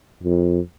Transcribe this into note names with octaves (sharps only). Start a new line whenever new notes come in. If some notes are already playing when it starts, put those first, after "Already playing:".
F2